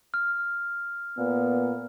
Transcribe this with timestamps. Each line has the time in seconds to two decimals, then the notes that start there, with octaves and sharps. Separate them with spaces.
0.14 F6
1.18 A#2 B3